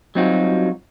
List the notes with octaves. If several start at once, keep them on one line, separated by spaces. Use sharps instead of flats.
F#3 G3 C4 D#4 F4 F#4